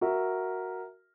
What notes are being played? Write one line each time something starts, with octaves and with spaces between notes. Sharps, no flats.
F#4 A#4 E5